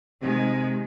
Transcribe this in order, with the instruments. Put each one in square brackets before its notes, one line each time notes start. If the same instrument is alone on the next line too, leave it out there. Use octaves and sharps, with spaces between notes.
[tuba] C3 [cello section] D#3 G#3